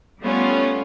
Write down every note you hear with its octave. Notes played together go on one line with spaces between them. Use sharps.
G3 A3 B3 C#4 F4